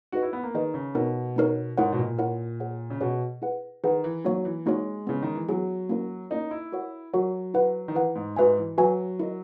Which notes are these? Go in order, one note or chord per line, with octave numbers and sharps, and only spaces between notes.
D#4 F#4 G#4 B4 D#5
E4
B3
A#3
D#3 D#4 G#4 B4 D#5
C#3
B2 B3 D#4 A#4 C#5
B3 D#4 A#4 C#5
G#2 E4 A#4 C#5 F#5
B2
A#2
E4 A#4 C#5 F#5
G#4 C#5 F#5
C#3
B2 G#4 C#5 F#5
E4 G#4 B4 F#5
D#3 E4 G#4 B4 F#5
E3
F#3 A#3 D#4 F#4 C#5
E3
G#3 A#3 D#4 F#4 C#5
C#3 B3 E4 G#4
D#3
E3
F#3 B3 E4 G#4
A#3 C#4 E4 A#4 C#5
A#3 C#4 D#4 E4 A#4 C#5
E4
F#4 A#4 C#5 F#5
F#3 F#4 A#4 C#5 F#5
E4 B4 F#5
D#3
E3 E4 B4 F#5
G#2
G#2 F#4 B4 E5 G#5
E3
F#3 F#4 B4 E5 G#5
E4 A#4 D#5